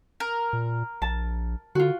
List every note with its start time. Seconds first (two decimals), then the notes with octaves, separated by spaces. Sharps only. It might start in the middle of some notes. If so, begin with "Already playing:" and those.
0.20 A#4
0.53 A#2
1.02 A#1 A5
1.75 D3 F4 F#4